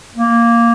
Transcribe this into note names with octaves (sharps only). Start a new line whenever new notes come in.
A#3